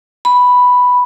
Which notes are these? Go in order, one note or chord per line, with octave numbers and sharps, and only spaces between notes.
B5